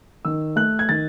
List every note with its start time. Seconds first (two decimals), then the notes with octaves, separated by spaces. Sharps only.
0.25 D#3 E6
0.56 A3 F#6
0.79 G#6
0.89 D#3 A6